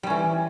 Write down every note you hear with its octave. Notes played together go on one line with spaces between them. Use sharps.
E3 G3 C#4